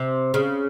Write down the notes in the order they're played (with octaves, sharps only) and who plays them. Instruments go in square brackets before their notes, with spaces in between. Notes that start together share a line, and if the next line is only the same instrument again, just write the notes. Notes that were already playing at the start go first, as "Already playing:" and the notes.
Already playing: [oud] C3
C#3